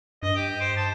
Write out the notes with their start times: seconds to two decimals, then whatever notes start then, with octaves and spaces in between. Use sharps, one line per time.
0.23 G2 D#5
0.35 G4
0.60 C5
0.76 A5